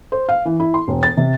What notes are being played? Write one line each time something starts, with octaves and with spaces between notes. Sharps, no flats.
C5
F5
E3
E4
C6
E1
A6
C3